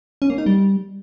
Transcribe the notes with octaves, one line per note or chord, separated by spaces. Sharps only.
C#4
A#3
D#4
G3